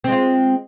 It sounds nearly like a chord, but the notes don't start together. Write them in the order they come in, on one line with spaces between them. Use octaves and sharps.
C4 G#3 F4